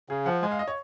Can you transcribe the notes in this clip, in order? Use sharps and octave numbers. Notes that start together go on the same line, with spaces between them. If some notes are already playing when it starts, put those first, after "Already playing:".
C#3 G#4
F3 F#5
G#3 G#5
F5
D#5
C#5